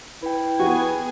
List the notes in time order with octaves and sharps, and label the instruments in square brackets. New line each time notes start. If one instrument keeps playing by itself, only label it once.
[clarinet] E4 [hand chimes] B4 G5
[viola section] B3 G#4 G#5 [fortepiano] F#4